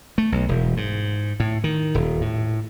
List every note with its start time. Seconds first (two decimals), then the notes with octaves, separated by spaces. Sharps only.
0.18 A3
0.32 B1
0.49 E1
0.77 G#2
1.40 A2
1.64 D#3
1.95 D#1
2.21 A2